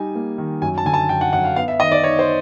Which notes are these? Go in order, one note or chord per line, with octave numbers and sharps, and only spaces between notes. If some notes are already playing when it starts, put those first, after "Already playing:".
Already playing: G3 D#4 G#5
A#3
D#3
F#2 G#5
A5
D3 G#5
A5
F#2 G5
F#5
F#2 F#5
F5
B3 F5
E5
D#3 D#5
D5
D#4 C#5
C5